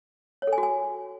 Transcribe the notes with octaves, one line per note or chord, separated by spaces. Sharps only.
C#5
A4
G#5
F#4
G#5